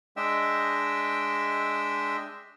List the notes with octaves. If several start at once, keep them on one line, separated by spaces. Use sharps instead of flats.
G#3 D4 D#5 E5 G5 E6